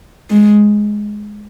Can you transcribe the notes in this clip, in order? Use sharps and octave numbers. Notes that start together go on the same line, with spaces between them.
G#3